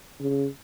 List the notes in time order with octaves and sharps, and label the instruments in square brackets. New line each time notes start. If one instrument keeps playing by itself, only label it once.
[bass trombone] C#3